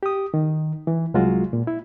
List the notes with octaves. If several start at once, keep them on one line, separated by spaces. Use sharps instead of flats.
G4 D#6
D#3
E3
C2 F#3 G#3 F4 F#4
A#2
E4